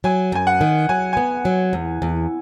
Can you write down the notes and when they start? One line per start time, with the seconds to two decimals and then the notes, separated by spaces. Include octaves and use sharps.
0.04 F#3 G#5
0.32 F#2 G#5
0.47 F#5
0.61 D#3
0.89 F#3 G#5
1.13 B3 G#5
1.45 F#3
1.73 E2
2.02 E2